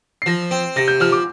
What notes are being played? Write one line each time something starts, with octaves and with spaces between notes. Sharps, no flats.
C7
F3 A#6
C4
C3 A#6
G6
F3 F6
D6